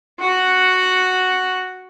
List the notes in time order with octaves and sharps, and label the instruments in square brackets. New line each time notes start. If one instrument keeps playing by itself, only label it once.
[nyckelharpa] F#4 F#5